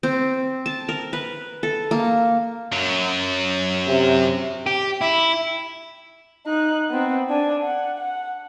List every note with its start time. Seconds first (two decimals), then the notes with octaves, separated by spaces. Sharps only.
0.03 C4
0.66 A5
0.89 A#4
1.13 B4
1.63 A4
1.91 A#3
2.72 F#2 F#3
3.88 C3
4.66 G4
5.01 E4
6.46 D#4 F#6
6.90 B3 C4
7.30 D4 G#5
7.64 F#5
7.98 F#5